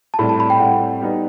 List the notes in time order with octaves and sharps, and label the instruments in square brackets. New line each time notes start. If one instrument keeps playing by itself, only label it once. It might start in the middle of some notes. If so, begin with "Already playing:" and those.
[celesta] A5
[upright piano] A2 G3 C4 [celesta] B5
[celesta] A5
B5
G5
[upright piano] A2 G3 C4 [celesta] F#5
[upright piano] G3 B3 D#4 G4